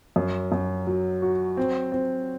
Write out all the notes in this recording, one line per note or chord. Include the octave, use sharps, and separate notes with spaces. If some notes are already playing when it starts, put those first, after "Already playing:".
F#2
F#2
F#3
F#4
C4
C4